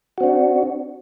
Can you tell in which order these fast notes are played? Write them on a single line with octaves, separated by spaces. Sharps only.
F#4 C4 D4